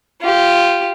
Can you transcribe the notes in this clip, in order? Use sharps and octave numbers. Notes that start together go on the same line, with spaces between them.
F4 G4